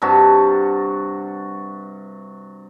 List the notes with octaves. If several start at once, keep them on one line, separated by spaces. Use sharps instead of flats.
G2 C3 F#4 A5